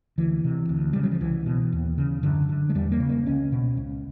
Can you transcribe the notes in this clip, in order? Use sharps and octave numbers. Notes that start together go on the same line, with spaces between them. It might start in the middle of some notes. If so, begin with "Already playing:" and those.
D2 E3
C3
D2
C#3 G3
F#3
F3
C2 E3
B2
D#2
C#3
F#2 D3
D3
G#3
E2 G3
A#3
C#3
A#3
C#2 C#4
B2
C#2